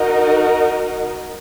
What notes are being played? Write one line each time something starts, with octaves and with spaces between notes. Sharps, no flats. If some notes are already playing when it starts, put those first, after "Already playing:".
Already playing: D#4 F#4 A#4 D#5